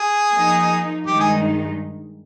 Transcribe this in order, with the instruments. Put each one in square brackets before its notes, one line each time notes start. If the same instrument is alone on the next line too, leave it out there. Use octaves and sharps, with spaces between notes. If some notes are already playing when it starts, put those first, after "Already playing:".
Already playing: [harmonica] G#4
[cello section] F3 A#3 D#4
[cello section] G2 D#3 G#3 D#4 [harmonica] G4
[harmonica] G#4